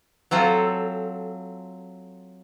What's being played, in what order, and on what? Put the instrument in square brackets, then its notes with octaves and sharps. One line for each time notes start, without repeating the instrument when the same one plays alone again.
[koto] F#3 C4 F4 A4